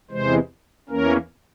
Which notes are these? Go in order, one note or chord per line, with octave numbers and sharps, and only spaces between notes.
E2 C3 E3 G#3 C5
E2 E3 A#3 C#4 A#4